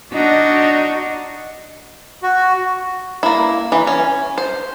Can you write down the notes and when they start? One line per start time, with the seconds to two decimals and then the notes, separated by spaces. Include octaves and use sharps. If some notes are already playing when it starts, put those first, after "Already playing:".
0.12 D4 D#4 F#4
2.23 F#4
3.23 A#3 E4
3.72 E3
3.87 C#4
4.38 C5